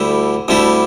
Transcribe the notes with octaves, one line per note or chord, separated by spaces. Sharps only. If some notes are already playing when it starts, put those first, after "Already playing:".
Already playing: D2 D3 G3 E4
D2 D3 G3 E4